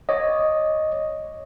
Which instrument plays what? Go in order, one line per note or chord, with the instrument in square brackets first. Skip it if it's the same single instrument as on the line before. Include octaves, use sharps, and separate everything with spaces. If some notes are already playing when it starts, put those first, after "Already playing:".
[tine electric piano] C#5 D#5